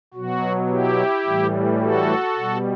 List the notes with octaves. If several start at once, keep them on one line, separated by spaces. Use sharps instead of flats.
B2 F#3 F#4
E4 G4
A2 E3 G3
F#4 A4
B2 G3